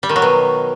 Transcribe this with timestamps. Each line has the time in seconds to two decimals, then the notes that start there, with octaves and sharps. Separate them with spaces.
0.03 G3
0.09 D#3
0.16 F#3
0.22 B2